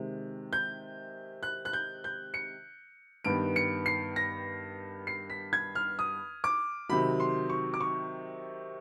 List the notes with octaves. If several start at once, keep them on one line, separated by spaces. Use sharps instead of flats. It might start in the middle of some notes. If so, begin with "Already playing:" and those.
Already playing: C3 D#3 G#3
G6
F#6
F#6
G6
G6
C#7
G2 D#3 G3 B3 D7
C#7
C7
A#6
C7
B6
G#6
F6
D#6
D6
C3 D#3 F#3 B5
C6
C#6
D6
C#6